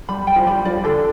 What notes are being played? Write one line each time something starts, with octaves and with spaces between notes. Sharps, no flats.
G3 B5
G5
F3
G3 B5
F3 D5
D3 A4